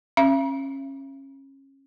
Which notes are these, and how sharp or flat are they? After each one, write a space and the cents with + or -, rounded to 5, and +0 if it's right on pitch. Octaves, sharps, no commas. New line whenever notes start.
C#4 -25 E5 +45